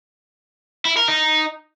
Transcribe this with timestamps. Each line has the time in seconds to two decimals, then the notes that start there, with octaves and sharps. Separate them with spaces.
0.85 E4
0.97 A#4
1.08 D#4